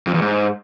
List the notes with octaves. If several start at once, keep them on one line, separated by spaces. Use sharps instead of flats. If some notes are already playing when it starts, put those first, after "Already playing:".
F2
E2
G#2